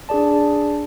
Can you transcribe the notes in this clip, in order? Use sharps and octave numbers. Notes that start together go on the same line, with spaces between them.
D4 G#4 D5 A5